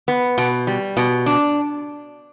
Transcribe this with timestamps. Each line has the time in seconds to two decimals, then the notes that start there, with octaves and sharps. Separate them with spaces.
0.08 B3
0.38 B2
0.67 G3
0.97 B2
1.26 D4